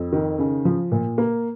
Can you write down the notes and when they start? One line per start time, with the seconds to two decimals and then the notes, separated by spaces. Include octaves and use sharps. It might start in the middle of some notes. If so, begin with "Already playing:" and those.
Already playing: F2
0.13 D#3
0.39 C#3
0.65 F3
0.92 A#2
1.18 A#3